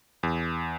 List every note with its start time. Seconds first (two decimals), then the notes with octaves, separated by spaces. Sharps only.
0.23 E2